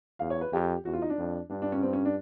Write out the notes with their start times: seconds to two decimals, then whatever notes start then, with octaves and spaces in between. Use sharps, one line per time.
0.19 E2 F5
0.30 C#5
0.41 B4
0.52 F2 G4
0.85 E2 F#4
0.93 F4
1.02 D#4
1.10 D4
1.18 F2
1.50 G2 D4
1.62 D4
1.72 C#4
1.82 C4
1.93 C#4
2.05 D4